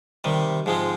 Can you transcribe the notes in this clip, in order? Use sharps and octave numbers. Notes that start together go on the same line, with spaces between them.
C3 D#3 G3
G#2 F3 G#3 C4